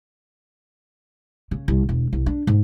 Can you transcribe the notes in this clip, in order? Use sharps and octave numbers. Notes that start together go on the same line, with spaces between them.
C#3
C2
E1
C2
D4
G#2